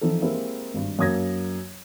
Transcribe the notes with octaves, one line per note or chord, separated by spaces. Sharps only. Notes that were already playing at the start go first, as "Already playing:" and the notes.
E3 F3 C4 D#4 A4
G#3 A#3 C4 E4 G4 A#4
G#1 G2
F#2 A#3 D#6 G#6 A#6